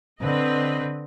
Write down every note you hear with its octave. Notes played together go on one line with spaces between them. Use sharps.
D3 C4 B4 D#5